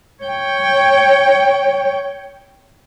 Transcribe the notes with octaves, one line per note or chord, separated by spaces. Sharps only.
C#5 G5